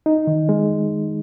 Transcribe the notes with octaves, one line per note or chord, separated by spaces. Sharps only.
D#4
D#3
G#3